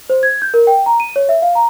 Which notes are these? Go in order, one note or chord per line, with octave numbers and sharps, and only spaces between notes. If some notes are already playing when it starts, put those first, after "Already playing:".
C5
G#6
G6
A#4
G5
A#5
D#7
C#5
E5
F5
A#5